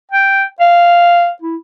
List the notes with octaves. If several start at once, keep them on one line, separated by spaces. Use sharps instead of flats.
G5
F5
E4